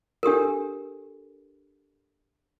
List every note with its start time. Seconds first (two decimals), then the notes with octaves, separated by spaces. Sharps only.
0.23 D4 G4 A4 A#4